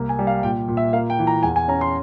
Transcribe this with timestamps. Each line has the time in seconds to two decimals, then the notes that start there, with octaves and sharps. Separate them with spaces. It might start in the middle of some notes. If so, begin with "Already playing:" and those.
Already playing: C2 A#3
0.09 G#5
0.19 G3
0.27 F5
0.43 A#2 G5
0.68 A#2
0.77 E5
0.93 A#3 F5
1.10 G5
1.19 E3
1.27 A#5
1.43 E2 G#5
1.56 G#5
1.68 C#4 A#5
1.81 C6